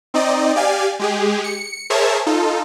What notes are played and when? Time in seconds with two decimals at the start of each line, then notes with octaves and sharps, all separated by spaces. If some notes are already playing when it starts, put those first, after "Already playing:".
0.14 C4 D#4 D5 D#5
0.56 G4 D5 F5 G#5
0.99 G#3 G4 G#4
1.44 C#7
1.90 G#4 A#4 C5 C#5 E5 A5
2.26 D#4 F4 A4